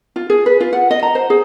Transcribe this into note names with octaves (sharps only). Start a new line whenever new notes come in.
F4
G#4
B4
F4
F#5
D#5
A#5
C5
G#4